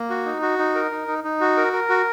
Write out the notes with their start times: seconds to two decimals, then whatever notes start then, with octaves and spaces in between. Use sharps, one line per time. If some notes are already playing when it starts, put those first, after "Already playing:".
Already playing: A#3
0.10 F#4
0.26 D#4
0.42 F#4
0.59 D#4
0.75 A#4
0.91 D#4
1.08 D#4
1.24 D#4
1.41 F#4
1.57 A#4
1.73 A#4
1.89 F#4